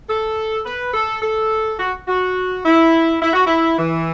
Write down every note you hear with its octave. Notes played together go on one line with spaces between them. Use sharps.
A4
B4
A4
A4
F#4
F#4
E4
E4
F#4
E4
E3